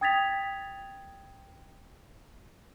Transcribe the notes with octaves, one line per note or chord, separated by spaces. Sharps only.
G5 D#6 G#6 A6 B6 F7